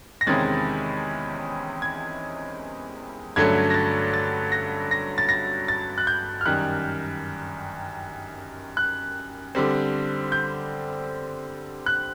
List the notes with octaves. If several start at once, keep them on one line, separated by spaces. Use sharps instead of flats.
A#6
E2 C3 D#3 G#3 C#4 A6
G#6
G2 D3 F#3 A3 C#4 G#6
A#6
A6
A6
A#6
A#6
A6
A#6
A6
F#6
G6
F6
F#2 D#3 G3 F#6
F#6
D3 G3 C4
G6
F#6